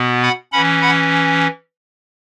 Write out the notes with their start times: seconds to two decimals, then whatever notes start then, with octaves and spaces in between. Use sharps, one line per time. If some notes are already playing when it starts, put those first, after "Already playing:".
Already playing: B2 B3
0.23 F#5 B5
0.52 E3 C#4 F#5 B5
0.81 F#5 B5